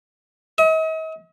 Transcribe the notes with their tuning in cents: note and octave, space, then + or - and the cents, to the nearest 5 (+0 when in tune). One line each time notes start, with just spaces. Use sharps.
D#5 +45